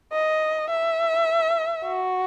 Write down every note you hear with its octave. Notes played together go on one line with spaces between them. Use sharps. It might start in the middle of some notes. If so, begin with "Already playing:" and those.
D#5
E5
F#4